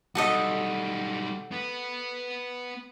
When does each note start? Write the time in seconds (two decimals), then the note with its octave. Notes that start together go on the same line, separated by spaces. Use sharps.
0.15 B1 G3 F#4 A4 D#5
1.52 B3